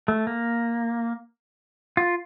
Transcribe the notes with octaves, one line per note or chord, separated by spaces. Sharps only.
A3
A#3
F4